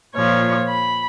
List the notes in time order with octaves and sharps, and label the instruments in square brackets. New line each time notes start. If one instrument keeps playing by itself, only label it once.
[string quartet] A#2 F3 C#5
B5